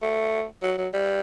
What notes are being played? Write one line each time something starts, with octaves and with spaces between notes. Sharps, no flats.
A3
F#3
F#3
G3